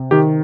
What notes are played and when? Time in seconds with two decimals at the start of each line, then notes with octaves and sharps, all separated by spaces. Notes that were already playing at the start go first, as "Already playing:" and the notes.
Already playing: C3
0.11 D#3 G4